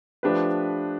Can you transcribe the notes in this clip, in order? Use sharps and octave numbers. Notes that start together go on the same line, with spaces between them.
F3 A3 D4 G4 B4